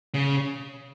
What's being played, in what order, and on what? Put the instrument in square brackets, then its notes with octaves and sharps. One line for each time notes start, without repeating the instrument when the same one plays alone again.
[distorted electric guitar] C#3